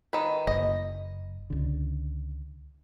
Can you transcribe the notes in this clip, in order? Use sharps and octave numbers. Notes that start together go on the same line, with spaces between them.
D#3 B4
F#1 D#5
C#2 D3